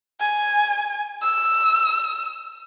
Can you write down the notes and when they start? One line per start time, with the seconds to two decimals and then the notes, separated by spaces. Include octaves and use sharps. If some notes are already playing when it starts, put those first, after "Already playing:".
0.20 G#5
1.22 E6